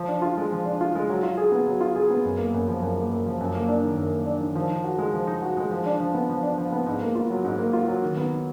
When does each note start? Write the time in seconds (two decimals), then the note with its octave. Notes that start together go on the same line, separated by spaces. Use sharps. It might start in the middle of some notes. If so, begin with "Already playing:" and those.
Already playing: F3
0.08 D4
0.22 F4
0.37 G#3
0.52 F3
0.66 D4
0.81 F4
0.95 G#3
1.10 F#3
1.23 F4
1.37 G#4
1.52 B3
1.67 F#3
1.81 F4
1.96 G#4
2.11 B3
2.25 F#2
2.38 A#3
2.54 F#2
2.68 F3
2.82 F#2
2.97 A#3
3.11 F#2
3.26 F3
3.41 F#2
3.55 A#3
3.69 D4
3.83 D#3
3.98 F#2
4.12 A#3
4.26 D4
4.41 D#3
4.55 F3
4.70 D#4
4.84 F#4
4.99 G#3
5.14 F3
5.27 D#4
5.42 F#4
5.57 G#3
5.71 F3
5.86 D4
6.00 F3
6.14 B3
6.29 F3
6.43 D4
6.58 F3
6.72 B3
6.86 G#2
7.01 A#3
7.15 F4
7.30 F#3
7.45 G#2
7.59 A#3
7.73 F4
7.88 F#3
8.02 D#3
8.17 B3
8.31 D#4